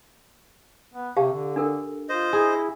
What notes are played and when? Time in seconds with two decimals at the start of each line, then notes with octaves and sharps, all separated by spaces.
0.94 B3
1.17 C3 G4 F5 A5
1.32 D3
1.56 D4 A4 A#4
2.09 F4 C5 D#5
2.33 E4 G#4